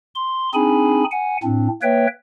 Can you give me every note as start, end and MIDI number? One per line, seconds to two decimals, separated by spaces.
0.15 0.49 84
0.54 1.04 60
0.54 1.04 62
0.54 1.04 63
0.54 1.04 68
0.54 1.04 80
0.54 1.04 83
1.11 1.37 78
1.11 1.37 80
1.43 1.68 45
1.43 1.68 60
1.43 1.68 62
1.82 2.07 58
1.82 2.07 71
1.82 2.07 73
1.82 2.07 76
1.82 2.07 79